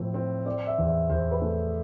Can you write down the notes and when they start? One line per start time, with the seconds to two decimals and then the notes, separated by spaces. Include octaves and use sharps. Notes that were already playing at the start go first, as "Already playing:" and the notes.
Already playing: A2 F3 C4
0.14 C4
0.46 C4 D5
0.67 E5
0.78 E2
0.88 E5
1.10 E2 C5
1.31 B4
1.42 A3